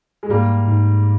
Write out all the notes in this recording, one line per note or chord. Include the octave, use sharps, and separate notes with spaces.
G#3
G#2 G3 A#3
G#2